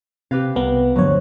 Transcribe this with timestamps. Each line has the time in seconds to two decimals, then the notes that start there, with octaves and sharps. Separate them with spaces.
0.31 C3 G4 B4 F5
0.56 C2 B3 A#4
0.96 D2 G2 F3 F#3 C#5